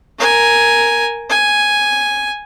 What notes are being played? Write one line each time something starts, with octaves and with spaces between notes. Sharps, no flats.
A#4 G#5
G#5